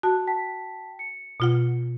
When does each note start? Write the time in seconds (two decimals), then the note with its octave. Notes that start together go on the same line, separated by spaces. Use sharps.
0.03 F#4 A5
0.27 G5 A5 B6
0.99 C#7
1.40 B2 F4 F#5